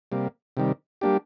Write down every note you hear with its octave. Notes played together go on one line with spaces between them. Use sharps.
C3 G3 A#3
C3 D#3 G3
G3 A#3 D4 G4